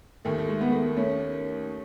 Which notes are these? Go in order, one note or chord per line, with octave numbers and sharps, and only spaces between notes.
D#2 D#3 A3
A3
G#3
B3
A3
A3 C#4